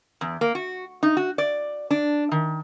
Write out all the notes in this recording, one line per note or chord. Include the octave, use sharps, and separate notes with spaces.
E2
A#3
F#4
D#4
F#4
D5
D4
D#3